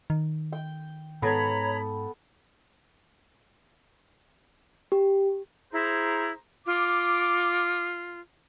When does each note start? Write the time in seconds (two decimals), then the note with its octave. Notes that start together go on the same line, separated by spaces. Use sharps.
0.10 D#3
0.52 G5
1.22 G#2 B3 A4 C#5 A#5 B5
4.92 G4
5.73 E4 G#4 C5 A#5
6.66 F4 D6